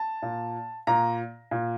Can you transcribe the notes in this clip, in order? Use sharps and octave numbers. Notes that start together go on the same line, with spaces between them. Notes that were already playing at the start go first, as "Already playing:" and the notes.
Already playing: A5
A#2
A#2 A#5
A#2